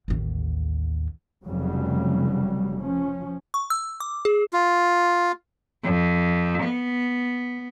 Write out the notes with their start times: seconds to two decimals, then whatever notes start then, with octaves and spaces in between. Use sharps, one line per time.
0.08 A1 D#2
1.44 F1 F2 C#3 F#3 G3
2.79 F3 C#4
3.54 C#6
3.70 E6
4.00 D6
4.25 G#4
4.53 F4
5.84 F2
6.63 B3